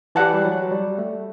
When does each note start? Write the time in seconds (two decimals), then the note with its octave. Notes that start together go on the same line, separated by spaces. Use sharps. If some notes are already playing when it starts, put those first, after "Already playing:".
0.15 E3 G4 D5 F#5 A5
0.34 G3
0.44 F#3
0.71 G3
0.98 A3